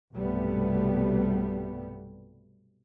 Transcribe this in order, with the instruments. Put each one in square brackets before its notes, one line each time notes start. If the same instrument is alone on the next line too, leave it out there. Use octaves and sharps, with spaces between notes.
[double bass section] B1 G2 C3 G3 A3 B3